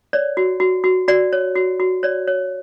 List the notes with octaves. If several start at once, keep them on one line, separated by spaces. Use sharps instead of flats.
C#5 D5
F#4
F#4
F#4
F#4 D5
C#5
F#4
F#4
C#5 D5
C#5